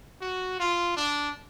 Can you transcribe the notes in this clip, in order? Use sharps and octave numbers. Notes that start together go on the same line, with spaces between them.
F#4
F4
D4